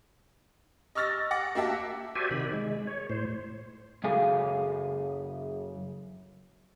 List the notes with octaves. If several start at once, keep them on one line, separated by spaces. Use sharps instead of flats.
D#5 C#6 E6 F6 A6 A#6
F#5 D6 A#6
A#3 F#4 G4 E5 A5
F#4 G4 C5 D5 E5 G#5
C3 D#3 B5
G#3
C#5
A2 C5
F#2 C#3 G#4 A4 F5 G#5